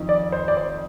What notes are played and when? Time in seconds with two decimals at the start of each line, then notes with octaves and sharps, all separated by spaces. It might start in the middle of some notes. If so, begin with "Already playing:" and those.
Already playing: F2 D#3
0.09 D5
0.32 C5
0.48 D5
0.57 C5